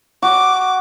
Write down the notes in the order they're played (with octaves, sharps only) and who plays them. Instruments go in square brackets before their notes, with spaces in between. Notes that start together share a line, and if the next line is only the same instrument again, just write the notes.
[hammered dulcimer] F#4 [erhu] D6